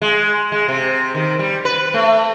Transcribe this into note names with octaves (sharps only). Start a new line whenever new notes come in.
G#3
G#3
C3
D#3
G3
B4
A3